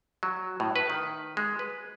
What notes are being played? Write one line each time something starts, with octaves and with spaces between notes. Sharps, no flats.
F#3
A2
B4
D#3
G#3
B4